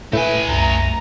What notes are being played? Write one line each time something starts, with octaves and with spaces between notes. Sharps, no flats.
A2 A3 B4 E5 G#5
C2 F#2 A#5